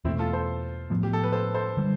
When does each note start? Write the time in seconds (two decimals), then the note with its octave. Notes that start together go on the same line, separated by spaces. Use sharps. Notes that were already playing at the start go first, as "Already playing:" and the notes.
0.05 E2 B2 A3 C4 E4
0.19 F4 A4
0.33 A4 C5
0.90 A2 F3 B3
1.03 G4
1.13 A4
1.24 B4
1.32 A4 C5
1.55 A4 C5
1.77 D3 G3